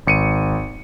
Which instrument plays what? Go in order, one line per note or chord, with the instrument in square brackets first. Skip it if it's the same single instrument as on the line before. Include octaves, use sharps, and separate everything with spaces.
[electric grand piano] G#1 C#7 D#7